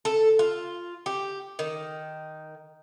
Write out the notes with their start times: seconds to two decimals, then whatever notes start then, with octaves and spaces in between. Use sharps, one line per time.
0.05 A4
0.39 F4
1.06 G4
1.59 D#3